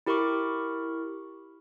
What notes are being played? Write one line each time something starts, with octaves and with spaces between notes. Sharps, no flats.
E4 G4 A#4 B5 C#6 D6